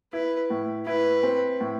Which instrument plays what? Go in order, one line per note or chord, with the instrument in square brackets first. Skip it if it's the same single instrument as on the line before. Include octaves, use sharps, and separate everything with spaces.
[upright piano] E4 [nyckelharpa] B4
[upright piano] A2
[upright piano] E4 [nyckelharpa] B4
[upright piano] C4
A2